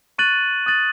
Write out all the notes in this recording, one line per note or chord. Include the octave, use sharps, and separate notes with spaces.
C#6 F#6 A6 D#7 F#7
D#6 F#6 A6 D#7 F#7